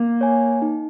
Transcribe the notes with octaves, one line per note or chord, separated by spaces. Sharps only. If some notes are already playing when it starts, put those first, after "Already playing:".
Already playing: A#3
C#5 G#5
D#4